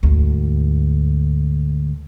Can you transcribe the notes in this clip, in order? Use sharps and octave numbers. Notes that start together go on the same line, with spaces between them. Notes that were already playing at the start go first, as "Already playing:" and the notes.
D2 G#2